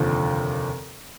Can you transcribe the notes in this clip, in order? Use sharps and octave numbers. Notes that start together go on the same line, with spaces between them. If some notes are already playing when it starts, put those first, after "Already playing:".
Already playing: F1 D#2 D3 F3